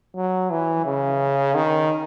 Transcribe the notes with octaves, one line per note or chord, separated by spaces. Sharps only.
F#3
E3
C#3
D#3